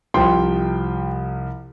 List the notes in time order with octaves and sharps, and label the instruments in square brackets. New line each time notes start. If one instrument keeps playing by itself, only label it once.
[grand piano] C2 C3 F3 G5 C6